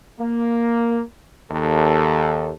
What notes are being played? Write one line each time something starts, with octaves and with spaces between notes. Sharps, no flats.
A#3
D#2 A4